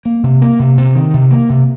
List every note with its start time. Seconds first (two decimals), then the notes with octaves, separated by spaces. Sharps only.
0.05 A#3
0.23 C3
0.42 A#3
0.59 C3
0.78 C3
0.95 D#3
1.14 C3
1.31 A#3
1.49 C3